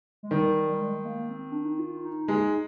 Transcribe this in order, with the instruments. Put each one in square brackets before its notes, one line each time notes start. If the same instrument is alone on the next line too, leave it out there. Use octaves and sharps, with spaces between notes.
[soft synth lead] G#3
[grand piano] D#3 [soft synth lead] G3
[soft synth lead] G3
G#3
G#3
A#3
C4
D4
D#4
F4
D#4
[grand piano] G#3